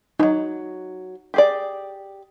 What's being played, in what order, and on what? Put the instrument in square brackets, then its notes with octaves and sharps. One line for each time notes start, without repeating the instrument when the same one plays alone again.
[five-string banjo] E3 F#3 [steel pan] D#4
[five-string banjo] G4 G#4 D5